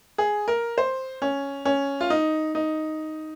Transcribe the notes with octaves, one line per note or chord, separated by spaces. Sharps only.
G#4
A#4
C5
C#4
C#4
F4
D#4
D#4